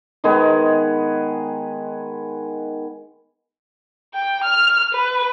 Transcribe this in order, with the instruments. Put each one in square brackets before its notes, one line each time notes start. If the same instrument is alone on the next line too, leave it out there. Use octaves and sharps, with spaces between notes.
[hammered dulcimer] D#3 G#3 B3 G#4
[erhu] G5
F6
B4